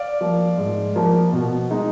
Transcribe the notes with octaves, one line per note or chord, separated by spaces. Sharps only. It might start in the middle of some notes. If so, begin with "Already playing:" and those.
Already playing: D5 F5
F3 A#3
G#2
F3 A#3
B2
G#3 D#4